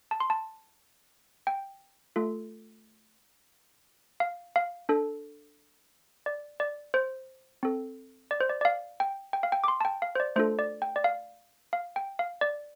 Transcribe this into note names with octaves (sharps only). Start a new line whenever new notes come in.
A5
C6
A5
G5
A3 F4 A4
F5
F5
D4 A4
D5
D5
C5
C4 A4
D5
C5
D5
D5
F5
G5
G5
F5
G5
D6
C6
A5
G5
F5
C5
D5
A3 D4 F4 A4 C5
D5
G5
D5
F5
F5
G5
F5
D5